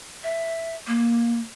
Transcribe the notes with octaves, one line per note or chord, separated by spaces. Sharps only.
E5
A#3